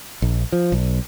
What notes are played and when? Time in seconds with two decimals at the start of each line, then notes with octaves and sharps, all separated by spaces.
0.22 A#1
0.52 F3
0.72 B1